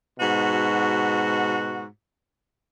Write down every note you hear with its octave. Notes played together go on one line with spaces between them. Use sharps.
G#2 B2 F#4